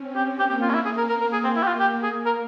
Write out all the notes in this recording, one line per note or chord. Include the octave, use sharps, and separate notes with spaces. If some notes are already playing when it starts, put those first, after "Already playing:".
Already playing: C4 C#4
G4
A#3 G4
G4
F4
C#4
E4
A#3 G#4
A#4
A#4
A#4
G#4
C4
E4
G4
F4
G4
G#4
A#4